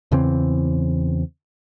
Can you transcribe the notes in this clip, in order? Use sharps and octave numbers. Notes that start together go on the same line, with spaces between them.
E2 C#3 E3 C4